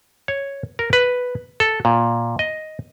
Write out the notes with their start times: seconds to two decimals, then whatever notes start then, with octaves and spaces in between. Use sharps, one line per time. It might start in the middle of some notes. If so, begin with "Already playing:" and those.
0.28 C#5
0.79 A#4
0.93 B4
1.60 A4
1.85 A#2
2.39 D#5